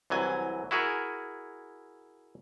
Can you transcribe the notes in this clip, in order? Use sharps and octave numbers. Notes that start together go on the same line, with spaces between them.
C2 E3 F#3 G#5
E4 F#4 G#4 A#4